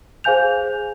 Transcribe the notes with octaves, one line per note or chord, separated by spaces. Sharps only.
G#4 C5 F5 G#5 G6 F7